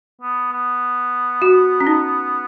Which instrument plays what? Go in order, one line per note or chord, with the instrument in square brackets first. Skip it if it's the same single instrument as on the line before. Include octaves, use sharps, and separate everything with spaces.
[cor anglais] B3
B3
[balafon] F#4
C#4
D#4